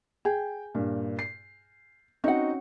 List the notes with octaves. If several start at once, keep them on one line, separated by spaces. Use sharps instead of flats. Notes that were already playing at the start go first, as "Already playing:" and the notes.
G#4 G5
G2 A#2
C7
C4 C#4 D#4 F#4 F#5